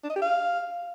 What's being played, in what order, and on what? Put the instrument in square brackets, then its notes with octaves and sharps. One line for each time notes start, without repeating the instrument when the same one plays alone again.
[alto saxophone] D4
D#5
G4
F5